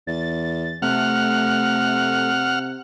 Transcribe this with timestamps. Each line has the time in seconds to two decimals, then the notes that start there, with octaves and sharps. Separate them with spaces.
0.07 E2 A6
0.82 C3 A3 F#5 F6